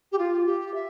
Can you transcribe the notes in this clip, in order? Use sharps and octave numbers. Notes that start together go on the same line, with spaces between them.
G4
F4
G4
E5